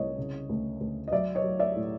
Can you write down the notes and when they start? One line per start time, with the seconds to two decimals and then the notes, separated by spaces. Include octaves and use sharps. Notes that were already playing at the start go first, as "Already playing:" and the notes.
Already playing: C2 C#5 D#5
0.18 C#3
0.49 D2
0.81 D2
1.08 D#5
1.12 F#3 D5 E5
1.35 C#5 D#5
1.43 F#3
1.59 D5 E5
1.76 A2